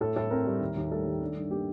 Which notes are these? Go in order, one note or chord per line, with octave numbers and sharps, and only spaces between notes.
A2 A4
A2 A4
C4 A#4
G3
D#2
D#2
G3 A4
D#3
D4
G2
A#3 G4